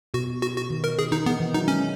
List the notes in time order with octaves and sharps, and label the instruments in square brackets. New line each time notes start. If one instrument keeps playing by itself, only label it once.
[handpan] B2 [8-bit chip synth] F#4
[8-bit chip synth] F#4
F#4
[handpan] D#3
[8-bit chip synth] A#4
[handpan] D#3 [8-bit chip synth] G#4
[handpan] D#3 [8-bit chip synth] D#4
[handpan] E3 [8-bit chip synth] B3
[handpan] E3
[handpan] F#3 [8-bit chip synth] D#4
[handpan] G#3 [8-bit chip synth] C#4